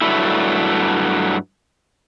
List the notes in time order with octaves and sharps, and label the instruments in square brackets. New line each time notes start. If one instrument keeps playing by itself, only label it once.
[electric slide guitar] G2 F#3 G3 A3 E4